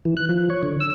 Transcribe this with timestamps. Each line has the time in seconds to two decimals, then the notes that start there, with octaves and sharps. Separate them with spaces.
0.05 E3
0.17 F#6
0.29 F3
0.50 C#5
0.63 D3
0.80 E6